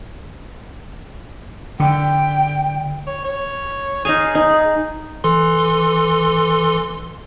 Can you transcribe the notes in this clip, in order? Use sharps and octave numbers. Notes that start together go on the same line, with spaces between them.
D3 G5
C#5
C#5
D#4 G#4 F5 G#5
D#4
E3 A4 C6